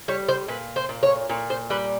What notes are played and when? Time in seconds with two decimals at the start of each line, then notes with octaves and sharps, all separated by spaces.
0.08 G3 C#5
0.28 C5
0.48 A#2 B4
0.76 C5
0.89 A#2
1.03 C#5
1.30 A#2 C#5
1.50 C5
1.70 G3 B4